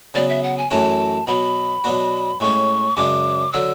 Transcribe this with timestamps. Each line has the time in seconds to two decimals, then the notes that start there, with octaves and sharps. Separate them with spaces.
0.14 C#3 F#3 B3 D5
0.29 E5
0.43 F#5
0.58 G#5
0.71 F#2 E3 A3 C#4 F#4 A5
1.27 B2 F#3 B3 B5
1.84 B2 F#3 B3 D4 F#4
2.40 A2 G#3 C#4 C#6
2.97 F#2 C#3 G#3 D4 D6
3.52 D3 F#3 E6